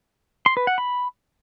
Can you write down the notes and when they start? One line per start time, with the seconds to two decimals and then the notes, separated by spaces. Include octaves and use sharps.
0.46 C6
0.57 B4
0.67 F#5
0.78 B5